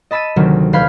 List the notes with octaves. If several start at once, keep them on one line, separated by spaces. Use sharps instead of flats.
D#5 A5 B5 E6 A6 D#7
D2 C3 D#3 F#3
E1 F5 B5 F6 G6 G#6